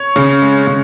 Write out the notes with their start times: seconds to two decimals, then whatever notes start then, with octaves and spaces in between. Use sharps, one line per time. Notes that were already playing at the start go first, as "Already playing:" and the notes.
Already playing: C#5
0.16 C#3
0.42 G#3
0.67 C#3